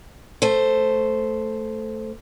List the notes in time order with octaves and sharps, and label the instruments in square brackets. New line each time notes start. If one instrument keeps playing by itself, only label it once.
[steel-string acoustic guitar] A3 C5